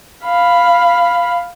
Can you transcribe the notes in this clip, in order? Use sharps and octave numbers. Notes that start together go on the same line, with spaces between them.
F5 B5